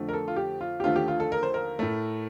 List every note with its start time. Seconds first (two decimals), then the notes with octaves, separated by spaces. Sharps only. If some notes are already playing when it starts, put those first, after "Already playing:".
Already playing: F2 D3 A3
0.09 A#4
0.13 A4
0.28 F4
0.36 G4
0.61 F4
0.80 G4
0.84 D#2 D3 F3 A3 F4
0.96 G4
1.08 F4
1.20 A4
1.32 A#4
1.43 C5
1.54 A#4
1.79 A2 A3